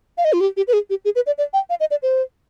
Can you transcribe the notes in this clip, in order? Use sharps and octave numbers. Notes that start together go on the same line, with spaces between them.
F5
D#5
F4
G4
G4
B4
G#4
G4
G#4
B4
D5
D5
G5
F5
D#5
D5
C5